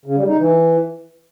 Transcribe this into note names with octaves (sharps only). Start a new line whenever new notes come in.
C#3
G3
D#4
E3